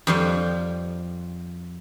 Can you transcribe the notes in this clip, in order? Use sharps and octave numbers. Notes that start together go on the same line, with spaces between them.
F2 F3 G3